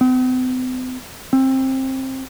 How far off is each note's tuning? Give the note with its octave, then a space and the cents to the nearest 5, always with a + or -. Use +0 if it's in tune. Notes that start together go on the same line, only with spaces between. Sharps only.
C4 -45
C4 +20